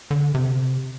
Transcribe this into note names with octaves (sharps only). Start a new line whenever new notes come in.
D3
C3